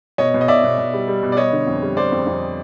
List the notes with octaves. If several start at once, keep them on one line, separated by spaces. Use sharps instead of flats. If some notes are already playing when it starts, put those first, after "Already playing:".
B2 C#5 D#5
B2
D#5
B2 D5 E5
B2
B2
G3
G3
B2
D5
G3 C#5 D#5
D3
F2
G3
G3 C5 D5
F2
F2